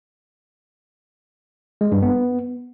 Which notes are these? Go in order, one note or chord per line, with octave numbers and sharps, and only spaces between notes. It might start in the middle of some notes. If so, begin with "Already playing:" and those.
G#3
G2
B3